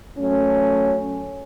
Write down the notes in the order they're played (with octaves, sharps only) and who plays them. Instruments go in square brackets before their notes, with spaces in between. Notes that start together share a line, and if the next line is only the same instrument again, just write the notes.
[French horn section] F#3 A3 C#4